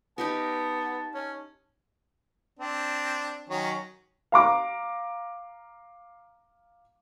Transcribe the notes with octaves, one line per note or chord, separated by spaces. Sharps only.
B3 D#4 G4 A#4 A5
C#4
C4 D4
D#3 F#3 C#4
F5 A#5 D6